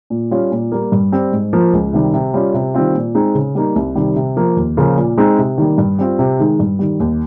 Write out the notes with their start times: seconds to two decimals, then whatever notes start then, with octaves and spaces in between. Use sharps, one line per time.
0.10 A#2
0.31 G3 C#4 F4
0.52 A#2
0.72 G3 A#3
0.92 G2
1.12 G3 C4
1.32 G#2
1.53 F3 A#3
1.73 C#2
1.93 C3 D#3 G3
2.13 C3
2.34 G3 C#4 F4
2.54 C3
2.74 D#3 G3 C4 F4
2.95 A#2
3.15 G#3 C4 D#4
3.35 C#3
3.55 G3 A#3 D#4
3.76 C2
3.95 C3 D#3 G3
4.16 C3
4.36 F3 A#3
4.57 D#2
4.77 C#3 F3 A#3 F4
4.97 A#2
5.17 G#3 C4 D#4
5.38 C3
5.58 D#3 G3 A#3
5.78 G2
5.98 G3 C4 F4
6.19 C3
6.39 D#3 G#3 D#4
6.60 G2
6.79 D#3 G3
7.00 D#2